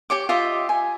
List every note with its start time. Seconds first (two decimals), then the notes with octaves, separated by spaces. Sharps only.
0.10 G4 C#5 D6
0.29 F4 G4 D#5 E5
0.69 G#5